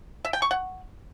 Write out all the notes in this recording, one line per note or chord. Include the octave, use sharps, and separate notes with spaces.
E5
G5
C#6
F#5